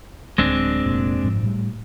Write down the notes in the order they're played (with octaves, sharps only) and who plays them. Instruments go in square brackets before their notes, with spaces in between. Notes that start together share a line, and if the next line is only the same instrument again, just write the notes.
[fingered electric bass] D1 [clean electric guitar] G#3 C4 D4
[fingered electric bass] F1 A#2
G#2 F3
A2 G3